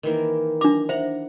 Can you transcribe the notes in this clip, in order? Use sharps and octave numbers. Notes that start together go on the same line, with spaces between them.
D#3 E3 A#3
D4 A#5 D6
C5 E5 F#5 A#5